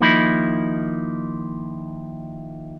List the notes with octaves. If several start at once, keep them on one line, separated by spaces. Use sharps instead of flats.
D#2 F3 A#3 D#4 E4 B5